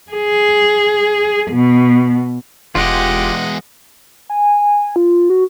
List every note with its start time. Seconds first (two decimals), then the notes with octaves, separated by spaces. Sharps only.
0.12 G#4
1.51 B2
2.75 E1 E2 G#3 F4 G4 D#5 F#5
4.30 G#5
4.96 F4
5.30 F#4